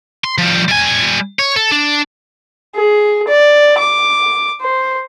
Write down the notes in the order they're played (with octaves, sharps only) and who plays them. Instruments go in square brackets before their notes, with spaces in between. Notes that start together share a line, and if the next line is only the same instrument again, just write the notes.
[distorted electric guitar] C6
F3 G3
G3 G#5
C#5
A4
D4
[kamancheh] G#4
D5
D6
C5